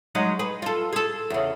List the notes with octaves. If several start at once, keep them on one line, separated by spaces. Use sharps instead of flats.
F#3 G#3 D#4
G#4 B4
F4 A4
G#4 A4
E2 C#3